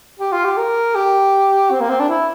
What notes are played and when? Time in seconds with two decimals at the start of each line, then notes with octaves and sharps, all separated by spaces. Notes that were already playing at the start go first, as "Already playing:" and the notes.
0.20 G4
0.33 F4
0.44 G4
0.57 A#4
0.95 G4
1.71 C4
1.81 A#3
1.90 C4
2.00 D4
2.09 E4